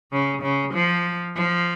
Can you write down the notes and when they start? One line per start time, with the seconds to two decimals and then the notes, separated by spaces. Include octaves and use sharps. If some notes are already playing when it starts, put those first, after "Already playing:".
0.12 C#3
0.43 C#3
0.74 F3
1.36 F3